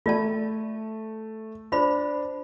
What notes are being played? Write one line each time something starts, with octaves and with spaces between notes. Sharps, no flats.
A3 F4 D5 A5
D4 F4 C5 B5